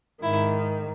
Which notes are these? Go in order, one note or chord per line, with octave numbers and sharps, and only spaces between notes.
G#2 D#3 E4